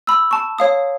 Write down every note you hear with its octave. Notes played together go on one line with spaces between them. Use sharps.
B5 E6
A5 C#6
C#5 F5 D#6